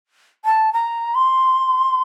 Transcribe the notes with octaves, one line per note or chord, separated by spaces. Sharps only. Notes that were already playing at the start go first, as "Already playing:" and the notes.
A5
A#5
C6